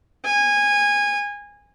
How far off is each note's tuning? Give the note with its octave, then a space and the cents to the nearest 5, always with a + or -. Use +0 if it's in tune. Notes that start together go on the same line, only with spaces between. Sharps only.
G#5 -20